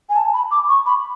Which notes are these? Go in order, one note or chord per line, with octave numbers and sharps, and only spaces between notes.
G#5
A5
B5
D6
C#6
B5